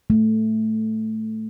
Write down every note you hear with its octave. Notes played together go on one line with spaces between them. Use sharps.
A3